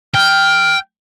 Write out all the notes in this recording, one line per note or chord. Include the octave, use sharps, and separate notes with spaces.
G5 F6